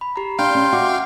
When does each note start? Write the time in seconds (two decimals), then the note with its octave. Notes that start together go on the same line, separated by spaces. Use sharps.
0.01 B5
0.16 G4 A#5
0.39 D4 F5 G5 C6
0.55 C#4
0.73 F#4 E5 F#5 D6